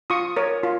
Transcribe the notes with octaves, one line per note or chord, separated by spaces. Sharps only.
F4 C#6 D#6
A#4 C#5
F4